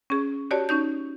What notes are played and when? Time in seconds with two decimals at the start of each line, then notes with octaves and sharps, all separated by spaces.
0.10 C#4 G#4
0.51 F#4 G4 C#5 D5 A5
0.69 C#4 D#4 G6